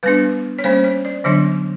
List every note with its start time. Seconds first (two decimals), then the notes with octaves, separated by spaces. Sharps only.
0.03 G3 B3 D4 B4
0.59 C#5
0.64 G3 A#3 C#4 C5
0.84 C#5
1.05 D5
1.24 D3 F#3 B3 D4 C#5